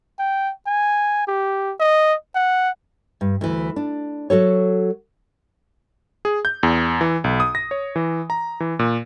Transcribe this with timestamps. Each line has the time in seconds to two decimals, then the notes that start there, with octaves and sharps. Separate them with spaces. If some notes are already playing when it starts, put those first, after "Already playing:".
0.19 G5
0.67 G#5
1.27 G4
1.80 D#5
2.35 F#5
3.21 G2
3.41 D2 E3
3.76 D4
4.30 F#3 F#4 A4 C#5
6.25 G#4
6.45 G6
6.63 E2
7.01 E3
7.24 B1
7.40 D#6
7.55 A#6
7.71 C#5
7.96 E3
8.30 A#5
8.60 E3
8.79 A#2